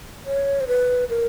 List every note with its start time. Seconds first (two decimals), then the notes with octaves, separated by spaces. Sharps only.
0.26 C#5
0.61 C5
0.68 B4
1.09 A#4